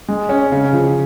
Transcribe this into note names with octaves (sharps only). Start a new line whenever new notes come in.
G#3
C#4
C#3
F3